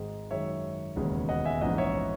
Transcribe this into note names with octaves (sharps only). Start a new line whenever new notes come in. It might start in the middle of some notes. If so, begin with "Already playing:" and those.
Already playing: G#1 G#2 D#3 G#3 D#5
F#2 D#3 G#3 C#5 E5
E1 D#2 C#3 G#3 B3
D#5 F#5
E5 G#5
A#1 G#2 E3 G#3 C#4 D#5 F#5
C#5 E5